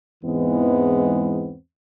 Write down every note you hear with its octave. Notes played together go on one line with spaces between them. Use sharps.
E2 G#2 E3 G#3 B3 C4